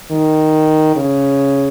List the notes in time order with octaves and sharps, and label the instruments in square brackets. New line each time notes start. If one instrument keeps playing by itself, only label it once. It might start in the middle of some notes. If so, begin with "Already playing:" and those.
[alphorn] D#3
C#3